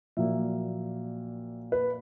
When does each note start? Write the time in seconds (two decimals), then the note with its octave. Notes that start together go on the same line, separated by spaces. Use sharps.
0.17 A#1 A#2 F#3 A#3 E5
1.72 B4